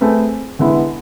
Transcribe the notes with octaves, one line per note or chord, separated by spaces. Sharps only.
A3 C4 G#4 B4
D3 G#3 B3 E4